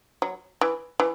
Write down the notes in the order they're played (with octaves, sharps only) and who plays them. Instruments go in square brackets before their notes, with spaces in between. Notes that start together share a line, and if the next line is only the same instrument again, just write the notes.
[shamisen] F#3
E3
E3